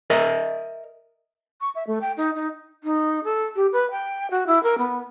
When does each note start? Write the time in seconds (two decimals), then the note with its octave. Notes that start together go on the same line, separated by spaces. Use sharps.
0.10 A#4 D#5 E5
1.61 C#6
1.75 E5
1.87 A3
2.01 G5
2.17 D#4
2.35 D#4
2.84 D#4
3.24 A4
3.56 G4
3.73 B4
3.91 G5
4.31 F#4
4.47 E4
4.63 A#4
4.78 B3